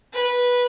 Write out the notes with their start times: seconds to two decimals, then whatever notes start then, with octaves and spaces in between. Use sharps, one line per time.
0.13 B4